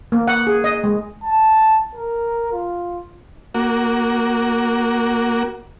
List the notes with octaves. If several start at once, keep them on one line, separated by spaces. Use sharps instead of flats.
A#3
F#5
G#4
D#5
G#3
A5
A#4
F4
A#3 F#4